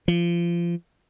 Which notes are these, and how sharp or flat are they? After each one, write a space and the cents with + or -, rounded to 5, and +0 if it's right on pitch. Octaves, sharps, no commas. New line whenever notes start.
F3 -25